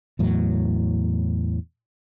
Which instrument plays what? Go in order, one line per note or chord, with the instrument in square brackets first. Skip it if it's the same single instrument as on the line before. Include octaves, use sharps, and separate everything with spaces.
[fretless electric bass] E2 A2 F#3